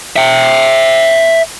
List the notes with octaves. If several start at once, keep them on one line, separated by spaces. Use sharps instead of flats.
E5 G5